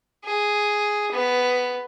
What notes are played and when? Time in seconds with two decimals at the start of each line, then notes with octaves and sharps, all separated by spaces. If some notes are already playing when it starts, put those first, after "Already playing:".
0.25 G#4
1.12 B3